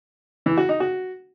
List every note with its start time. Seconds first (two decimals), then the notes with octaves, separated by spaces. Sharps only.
0.46 E3
0.57 F#4
0.69 D#4
0.80 F#4